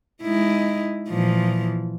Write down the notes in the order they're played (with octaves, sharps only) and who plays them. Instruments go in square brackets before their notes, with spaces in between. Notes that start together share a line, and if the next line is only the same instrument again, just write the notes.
[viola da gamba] G#3 D#4 E4
A#2 E3 F3